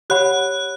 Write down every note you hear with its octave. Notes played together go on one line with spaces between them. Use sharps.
G4 C#5 F#5 B5 F#6